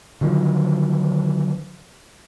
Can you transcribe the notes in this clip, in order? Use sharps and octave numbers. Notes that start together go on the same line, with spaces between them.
D3 D#3 F3 F#3